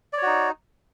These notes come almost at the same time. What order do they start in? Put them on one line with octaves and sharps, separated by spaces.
D5 C#5 F#4 D#4